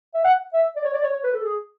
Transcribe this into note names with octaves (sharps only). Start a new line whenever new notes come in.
E5
F#5
E5
D5
C#5
D5
C#5
C#5
B4
A4
G#4